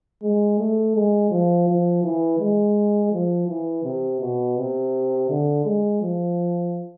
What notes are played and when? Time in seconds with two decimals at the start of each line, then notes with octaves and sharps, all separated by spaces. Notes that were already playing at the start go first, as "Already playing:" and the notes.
0.23 G#3
0.59 A3
0.96 G#3
1.31 F3
1.68 F3
2.04 E3
2.40 G#3
3.13 F3
3.49 E3
3.84 C3
4.20 B2
4.58 C3
5.30 D3
5.65 G#3
6.02 F3